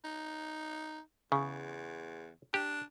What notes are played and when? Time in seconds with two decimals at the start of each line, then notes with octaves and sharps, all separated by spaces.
0.04 D#4
1.32 E2 C#3
2.54 D4 G4